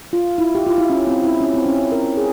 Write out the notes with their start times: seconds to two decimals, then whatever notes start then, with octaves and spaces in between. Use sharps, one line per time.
0.13 F4
0.38 E4
0.55 G4
0.67 F4
0.78 E4
0.90 C#4
1.07 C4
1.24 E4
1.41 C#4
1.54 C4
1.66 C#4
1.92 A#4
2.17 G#4